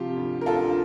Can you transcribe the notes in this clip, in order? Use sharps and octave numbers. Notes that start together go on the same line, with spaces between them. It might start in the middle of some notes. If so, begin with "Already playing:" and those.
Already playing: C3 F3 F4 G4
D2
A#4
D2 F4 A4